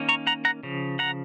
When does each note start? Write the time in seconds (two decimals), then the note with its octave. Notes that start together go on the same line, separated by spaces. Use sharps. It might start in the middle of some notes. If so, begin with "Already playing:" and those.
Already playing: D#3 A#3 C#4
0.09 A#5 C#6
0.27 F#5 A#5
0.45 F#5 A#5
0.63 C#3 F3
0.99 F#5 A#5